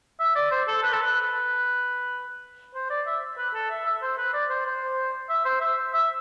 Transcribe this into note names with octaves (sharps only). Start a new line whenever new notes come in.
E5
D5
C5
A4
B4
A4
B4
C5
D5
E5
B4
A4
E5
E5
C5
B4
D5
C5
C5
E5
C5
E5
E5